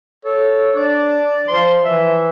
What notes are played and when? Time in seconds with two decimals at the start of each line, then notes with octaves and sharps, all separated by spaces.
0.25 A4 C#5
0.75 D4 D5
1.48 F3 C6
1.83 E3 E5